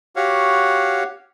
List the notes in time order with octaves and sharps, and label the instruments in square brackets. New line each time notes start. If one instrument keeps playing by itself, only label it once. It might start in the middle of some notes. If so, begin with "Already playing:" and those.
[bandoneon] F#4 G4 C#5 F5 F#5